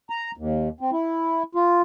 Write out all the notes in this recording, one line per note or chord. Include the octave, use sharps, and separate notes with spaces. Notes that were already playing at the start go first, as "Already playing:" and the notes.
A#5
D#2
C4
E4
F4